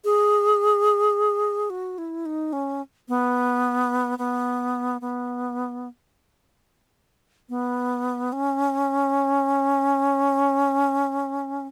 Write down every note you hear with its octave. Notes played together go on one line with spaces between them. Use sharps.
G#4
F#4
E4
D#4
C#4
B3
B3
B3
B3
C#4